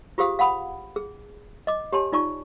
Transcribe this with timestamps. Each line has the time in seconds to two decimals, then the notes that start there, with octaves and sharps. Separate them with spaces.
0.18 F4 G4 G#4 C5 F5 D#6
0.39 F5 F#5 B5 D#6
0.96 G#4
1.67 D#5 D6
1.92 G4 C#5 G#5 A5 C6
2.12 D#4 F4 D5 A5 C#6